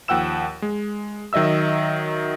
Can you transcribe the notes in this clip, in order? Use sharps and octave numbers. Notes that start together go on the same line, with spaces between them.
D#2 F3 F#5 G5 E6 E7
G#3
D#3 F#3 D#5 E5 E6